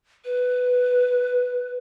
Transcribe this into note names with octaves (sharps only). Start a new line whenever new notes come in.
B4